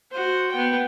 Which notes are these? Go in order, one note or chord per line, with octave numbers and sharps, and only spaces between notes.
F#4 C5
B3 G5